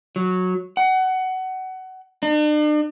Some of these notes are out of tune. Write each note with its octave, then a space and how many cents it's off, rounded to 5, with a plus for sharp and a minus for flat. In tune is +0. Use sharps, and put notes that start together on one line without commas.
F#3 -10
F#5 +20
D4 +45